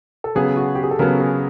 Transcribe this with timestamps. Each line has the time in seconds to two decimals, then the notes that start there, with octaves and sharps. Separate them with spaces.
0.24 A4
0.35 C#3 F#3 B3 G#4
0.57 F#4
0.75 G4
0.83 G#4
0.91 A4
0.99 C#3 F#3 B3 A#4
1.20 G#4